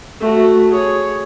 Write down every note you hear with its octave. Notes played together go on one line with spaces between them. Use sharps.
A3 F#4
G#4 C#5